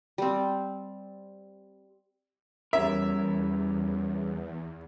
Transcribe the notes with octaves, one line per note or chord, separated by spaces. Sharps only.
G3 C4
E2 G3 C#4 A#4 E5